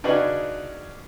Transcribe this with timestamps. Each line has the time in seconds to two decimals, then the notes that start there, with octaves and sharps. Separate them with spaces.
0.04 C#3 D4 D#4 F#4 G#4 B4